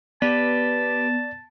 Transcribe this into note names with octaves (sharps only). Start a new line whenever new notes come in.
B3 G4 B4 D5 A5